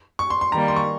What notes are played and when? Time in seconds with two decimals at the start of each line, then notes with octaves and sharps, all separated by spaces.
0.19 C#6
0.30 C6
0.41 C6
0.52 D#3 G3 A#3 A#5
0.68 C6
0.76 C#6